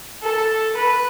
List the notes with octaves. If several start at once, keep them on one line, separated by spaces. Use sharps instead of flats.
A4
B4